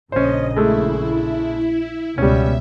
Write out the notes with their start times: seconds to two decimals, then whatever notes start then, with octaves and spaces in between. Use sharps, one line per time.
0.12 A#1 C#3 C#4 C5 D#5
0.56 G#3 A3 E4
2.18 C#2 B2 G3 B3 C#4 E5